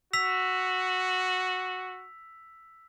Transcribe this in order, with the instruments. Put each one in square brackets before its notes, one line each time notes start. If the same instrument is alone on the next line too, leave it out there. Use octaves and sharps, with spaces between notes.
[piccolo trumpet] F#4 [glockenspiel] E6 B6 F7